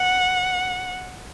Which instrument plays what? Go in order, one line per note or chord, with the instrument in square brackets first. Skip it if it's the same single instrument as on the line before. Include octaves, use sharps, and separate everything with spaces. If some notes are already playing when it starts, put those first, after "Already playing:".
Already playing: [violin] F#5